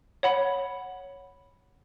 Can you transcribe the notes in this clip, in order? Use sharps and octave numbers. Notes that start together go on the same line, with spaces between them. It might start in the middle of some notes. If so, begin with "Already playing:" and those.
C#5 F#5 B5